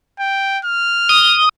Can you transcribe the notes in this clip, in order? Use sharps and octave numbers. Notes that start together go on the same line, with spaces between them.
G5
F6
D#6